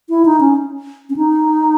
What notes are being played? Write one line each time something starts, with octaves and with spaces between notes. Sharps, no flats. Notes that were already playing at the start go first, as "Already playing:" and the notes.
E4
D#4
C#4
C#4
D#4